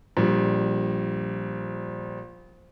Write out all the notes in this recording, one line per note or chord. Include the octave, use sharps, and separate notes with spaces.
A#1 G3